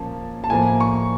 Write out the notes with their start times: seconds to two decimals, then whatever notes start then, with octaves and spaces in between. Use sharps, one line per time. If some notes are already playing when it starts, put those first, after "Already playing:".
Already playing: A#2 F3 A#3 C#4 A5
0.44 A5
0.50 A2 F3 A#3 G#5
0.80 C#6